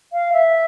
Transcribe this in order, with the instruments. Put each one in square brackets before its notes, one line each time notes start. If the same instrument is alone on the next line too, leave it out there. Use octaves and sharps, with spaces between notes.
[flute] F5
E5